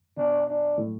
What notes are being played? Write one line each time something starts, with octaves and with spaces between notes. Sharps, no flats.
B2 D4
D4
A2